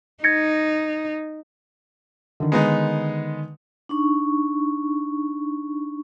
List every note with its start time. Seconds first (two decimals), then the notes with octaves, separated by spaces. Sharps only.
0.24 D#4 G#6 A#6 C#7
2.40 D3 D#3
2.52 G#3 B3 D#4
3.89 D4 D#4 C#6